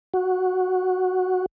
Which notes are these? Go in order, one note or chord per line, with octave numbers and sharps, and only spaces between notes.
F#4